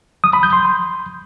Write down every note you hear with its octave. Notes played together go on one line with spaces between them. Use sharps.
D#6
B5
G6
C6